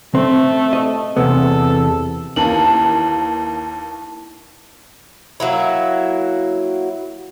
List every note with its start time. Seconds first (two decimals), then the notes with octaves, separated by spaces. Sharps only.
0.15 A3 C4
0.73 D#5
1.17 E2 C3 B3 A4
2.36 D#2 E3 A#3 E4 A5 F#7
5.40 F#3 A#3 E4